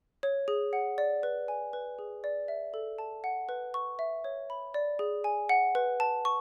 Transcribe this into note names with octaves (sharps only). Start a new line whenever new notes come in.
C#5
G#4
F#5
D5
B4
G#5
B4
G#4
D5
E5
A4
A5
F#5
B4
C#6
E5
C#5
B5
D5
G#4
G#5
F#5
B4
A5
C#6